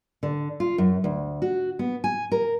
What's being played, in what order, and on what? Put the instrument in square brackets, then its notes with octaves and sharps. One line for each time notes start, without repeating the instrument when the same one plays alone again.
[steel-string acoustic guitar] D3
F4
F#2
D2
F#4
B3
G#5
A#4